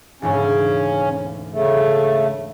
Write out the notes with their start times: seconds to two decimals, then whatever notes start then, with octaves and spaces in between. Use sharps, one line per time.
0.22 E1 D2 G#2 C#3 C#4
1.53 C#3 A3